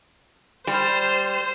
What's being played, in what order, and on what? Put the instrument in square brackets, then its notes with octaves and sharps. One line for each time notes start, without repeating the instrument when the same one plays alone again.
[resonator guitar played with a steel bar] G3 [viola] C5